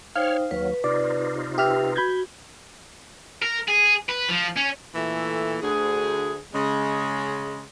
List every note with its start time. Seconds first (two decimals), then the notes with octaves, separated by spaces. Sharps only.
0.16 D#4 C5 C#5 F5 G5 F6
0.51 D#2 F#3 B4
0.84 C3 D#4 F4 D5
1.58 G4 B4 E5 F6
1.96 F#4 B5 G6 G#6
3.42 A#4
3.68 G#4
4.09 B4
4.29 F3
4.57 C#4
4.95 A#2 E3 A3 A4
5.62 D2 G#4
6.54 C#3 G#3